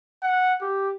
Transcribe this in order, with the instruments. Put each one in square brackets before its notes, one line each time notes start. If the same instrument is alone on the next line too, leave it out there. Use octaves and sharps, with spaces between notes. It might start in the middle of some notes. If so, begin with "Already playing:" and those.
[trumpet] F#5
G4